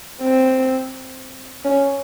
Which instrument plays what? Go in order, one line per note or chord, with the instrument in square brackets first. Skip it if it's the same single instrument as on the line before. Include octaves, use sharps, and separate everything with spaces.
[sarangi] C4
C#4